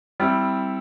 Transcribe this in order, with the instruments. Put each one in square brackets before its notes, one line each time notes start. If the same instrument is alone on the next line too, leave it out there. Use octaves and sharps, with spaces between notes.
[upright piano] G3 C4 E4